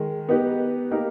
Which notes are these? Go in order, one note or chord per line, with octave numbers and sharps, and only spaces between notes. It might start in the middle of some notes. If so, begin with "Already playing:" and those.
Already playing: D#3 G#3
B3 D#4 G4 B4
A#3 D#4 G4 A#4